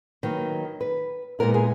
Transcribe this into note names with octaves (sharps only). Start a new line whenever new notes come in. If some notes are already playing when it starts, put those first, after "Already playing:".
D#3 F#3 A#3 D#4 B4
B4
A#2 G#3 B3 E4 A#4
G#4